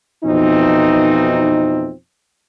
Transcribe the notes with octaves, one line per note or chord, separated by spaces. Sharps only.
F2 B2 E3 F3 C4 D#4